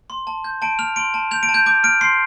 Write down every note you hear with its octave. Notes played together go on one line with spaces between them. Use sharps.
C6
A5
G6
A5 D7
F6 F7
C6 D7
A5
G6 F7
D7
A5
G6
D6 G6
F6 D7
C6 C7